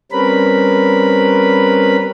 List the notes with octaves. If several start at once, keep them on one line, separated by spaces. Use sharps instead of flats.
G3 C4 C#4 A#4 B4 B5